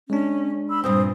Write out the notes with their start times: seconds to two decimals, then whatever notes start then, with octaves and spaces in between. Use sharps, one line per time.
0.10 G#3 C#4 D4
0.69 B5 C6 E6
0.84 G2 A#2 C4 C5 D#6